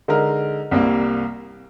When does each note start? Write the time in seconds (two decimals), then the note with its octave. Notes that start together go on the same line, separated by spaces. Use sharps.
0.08 D3 G#3 D#4 A#4
0.71 C2 C3 G3 A#3